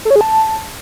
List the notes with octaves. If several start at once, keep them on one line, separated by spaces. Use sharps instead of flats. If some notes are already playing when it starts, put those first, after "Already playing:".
A4
C#5
G#4
A5